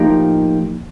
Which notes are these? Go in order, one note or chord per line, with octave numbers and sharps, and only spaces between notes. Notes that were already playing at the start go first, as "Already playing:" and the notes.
Already playing: A2 F3 A#3 D#4 G4